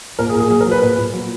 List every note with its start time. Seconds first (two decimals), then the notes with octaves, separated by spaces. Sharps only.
0.19 A#2 A#4
0.29 G#4
0.35 A#2
0.40 G#4
0.50 F#3 G#4
0.61 A#4
0.67 F#3 B4
0.82 A#2 B4
0.98 A#2
1.13 F#3